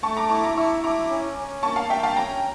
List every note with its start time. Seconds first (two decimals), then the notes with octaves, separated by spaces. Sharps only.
0.03 A3 A5 C#6
0.17 A#5 D6
0.30 E4 A5 C#6
0.43 A#5 D6
0.57 E4 C#6 E6
0.83 E4 A#5 D6
1.10 C#4
1.37 C#4
1.63 A#3 A5 C#6
1.76 F5 A5
1.90 A#3 E5 G5
2.03 F5 A5
2.16 C#4 G5 A#5